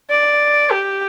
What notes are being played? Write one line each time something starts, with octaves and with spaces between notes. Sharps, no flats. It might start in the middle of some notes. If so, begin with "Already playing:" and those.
D5
G4